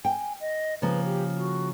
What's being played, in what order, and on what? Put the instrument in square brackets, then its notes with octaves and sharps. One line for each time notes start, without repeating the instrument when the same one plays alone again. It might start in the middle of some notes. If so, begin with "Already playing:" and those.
[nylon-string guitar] G5 [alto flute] G#5
[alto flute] D#5
[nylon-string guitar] C#3 F3 A#3 [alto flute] B4
[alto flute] G4
F#4